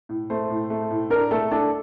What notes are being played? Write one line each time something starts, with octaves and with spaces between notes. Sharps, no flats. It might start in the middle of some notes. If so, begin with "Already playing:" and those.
A2
A3 C5
A2
A3
A2
D4 A#4
A3 A4
D4 A4